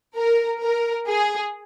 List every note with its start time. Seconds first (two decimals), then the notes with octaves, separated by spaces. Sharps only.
0.16 A#4
0.62 A#4
1.07 G#4